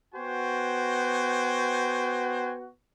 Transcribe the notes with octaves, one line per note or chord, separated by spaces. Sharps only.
B3 F#4 C5 G5 G#5